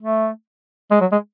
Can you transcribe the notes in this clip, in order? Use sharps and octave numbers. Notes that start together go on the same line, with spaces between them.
A3
G#3
F#3
G#3